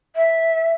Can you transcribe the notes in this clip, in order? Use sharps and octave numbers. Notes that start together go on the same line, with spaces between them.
E5